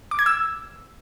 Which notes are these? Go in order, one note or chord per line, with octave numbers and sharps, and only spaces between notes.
D6
G#6
E6